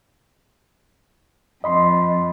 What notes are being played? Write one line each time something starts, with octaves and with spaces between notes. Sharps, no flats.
F2 D#5 B5 C6